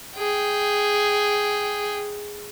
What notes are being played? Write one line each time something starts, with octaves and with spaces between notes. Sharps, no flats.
G#4 G5